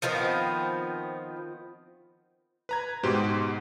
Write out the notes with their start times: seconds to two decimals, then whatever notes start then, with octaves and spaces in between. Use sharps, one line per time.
0.02 D#3 F3 B3 C4
2.69 B4 A#5 G#6
3.03 G#2 B2 G4 C5 C6